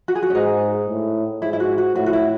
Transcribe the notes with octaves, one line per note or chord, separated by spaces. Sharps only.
F#4
G#4
F#4
C#4
G#2 D#4
A2
G#2 E4
E4
F#4
F#4
A2 F#4
F#4
E4